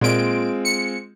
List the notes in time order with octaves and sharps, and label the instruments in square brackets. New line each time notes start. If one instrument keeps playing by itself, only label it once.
[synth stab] A#2 D7 [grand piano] G#3 C4 F4
[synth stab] C#7